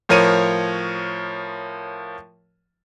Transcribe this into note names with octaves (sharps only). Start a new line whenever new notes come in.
A2 F3 A#4 C#5 D#7